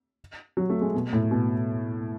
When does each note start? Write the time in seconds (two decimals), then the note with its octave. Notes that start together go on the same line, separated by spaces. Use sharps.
0.57 F#3
0.70 A3
0.81 G#3
0.95 B2
1.13 A2
1.31 B2